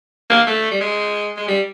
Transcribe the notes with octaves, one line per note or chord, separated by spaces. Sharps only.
A#3
A3
G3
G#3
G#3
G3